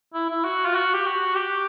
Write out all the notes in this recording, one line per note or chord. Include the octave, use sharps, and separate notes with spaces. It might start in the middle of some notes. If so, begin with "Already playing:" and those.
E4
E4
F#4
F4
F#4
G4
F#4
G4